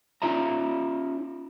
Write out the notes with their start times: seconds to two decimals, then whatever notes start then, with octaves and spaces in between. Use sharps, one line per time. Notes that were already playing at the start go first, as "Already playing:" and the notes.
0.22 C#4 D#4 F4 C#5 E5 A#5